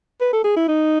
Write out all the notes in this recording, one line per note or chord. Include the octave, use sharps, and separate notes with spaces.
B4
A4
G#4
E4
D#4